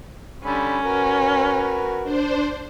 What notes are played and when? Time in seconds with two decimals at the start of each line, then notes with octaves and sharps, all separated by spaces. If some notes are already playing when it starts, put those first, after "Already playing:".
0.44 D3 G3 C#4 B5
0.84 F#4 A#4 B4
2.04 D4 C5